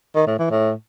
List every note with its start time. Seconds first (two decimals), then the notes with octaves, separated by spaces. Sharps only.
0.15 D#3
0.27 A2
0.39 E3
0.51 A2